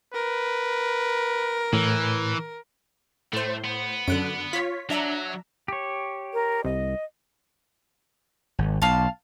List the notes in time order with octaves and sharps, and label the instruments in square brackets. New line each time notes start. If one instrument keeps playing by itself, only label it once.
[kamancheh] A#4 [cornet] B4
[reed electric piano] A2 [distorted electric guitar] E3
[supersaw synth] A2 C5 [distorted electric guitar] A3
[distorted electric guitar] B3
[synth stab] F#2 [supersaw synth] D3 F#6 D7
[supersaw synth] F4 C#5 [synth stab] B6
[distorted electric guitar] F#3 [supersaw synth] D4 E5 A#5
[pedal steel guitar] G4 C#5
[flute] A#4
[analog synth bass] C2 [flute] D#5
[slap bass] G#1
[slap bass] B1 [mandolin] F5 A5